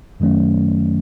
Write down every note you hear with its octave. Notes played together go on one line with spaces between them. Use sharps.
F#2 D#3 F#3 A3 C#4